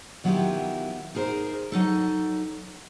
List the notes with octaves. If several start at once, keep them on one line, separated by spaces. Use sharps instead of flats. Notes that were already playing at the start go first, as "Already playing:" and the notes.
D#3 F#3 B3 E4 F4 G4
D#4 G#4 A#4 C5
F#3 D#4 A4